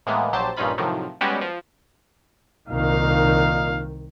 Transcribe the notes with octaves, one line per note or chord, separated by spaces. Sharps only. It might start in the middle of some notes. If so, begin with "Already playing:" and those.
A2 E3 G#3 A#3 B3
A#1 F#3 G4 C5 A5
A#1 G2 C#4 D#4 F4 B5
A2 C3 D#3 F3 F#3
G3 G#3 B3 C#4 F#4 G4
F3
C2 A#2 D#3 D#4 F5